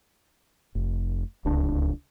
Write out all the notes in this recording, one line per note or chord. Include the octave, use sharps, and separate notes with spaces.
F1
D1 C#2 D4